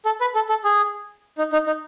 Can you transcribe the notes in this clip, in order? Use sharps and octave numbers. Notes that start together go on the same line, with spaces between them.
A4
B4
A4
A4
G#4
D#4
D#4
D#4